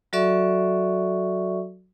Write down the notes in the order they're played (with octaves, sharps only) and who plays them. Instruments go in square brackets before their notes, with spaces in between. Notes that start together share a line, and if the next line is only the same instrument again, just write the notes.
[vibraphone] F#3 F#4 A4 D5 E5 C#6